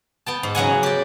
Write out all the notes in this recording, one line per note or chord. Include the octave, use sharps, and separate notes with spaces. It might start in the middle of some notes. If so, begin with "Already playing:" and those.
B3 G5 A5
G#2
C#3 F#3 F#5 G#5
G4 D5